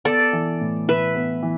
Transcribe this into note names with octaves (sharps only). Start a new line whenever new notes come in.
B3 A4 D5
E3
A2
A2 B4 E5
B3
E3